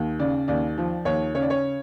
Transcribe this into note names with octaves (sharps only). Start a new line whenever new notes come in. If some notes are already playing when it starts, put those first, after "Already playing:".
Already playing: D#2
C#3 D5
D#2 D5
F3
D#2 C#5
C#3 C#5
D5
C#5